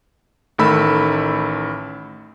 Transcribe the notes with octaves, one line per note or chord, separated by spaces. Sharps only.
A1 D#3 A3 B5 E6